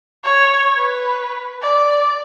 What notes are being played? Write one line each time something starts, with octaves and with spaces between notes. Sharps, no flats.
C#5
B4
D5